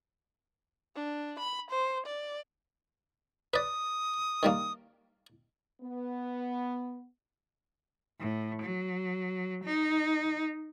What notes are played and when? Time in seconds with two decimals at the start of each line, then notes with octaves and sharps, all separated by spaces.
0.96 D4
1.39 B5
1.71 C5
2.06 D5
3.54 B4 D5 D#6
4.43 D#3 G3 A#3
5.81 B3
8.20 A2
8.63 F#3
9.65 D#4